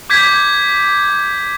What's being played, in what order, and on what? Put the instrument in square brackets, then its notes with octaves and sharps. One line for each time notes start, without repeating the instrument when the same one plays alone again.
[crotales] D6 G6 G#6 B6